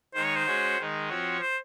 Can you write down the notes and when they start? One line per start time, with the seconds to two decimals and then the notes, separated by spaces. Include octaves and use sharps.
0.14 D#3 G#3 D#4 C5
0.25 C#5
0.36 C5
0.46 G#3 C#4 F#4 C#5
0.78 D#3 G#3 D#4
1.09 F3 C4 F#4 C#5
1.41 C5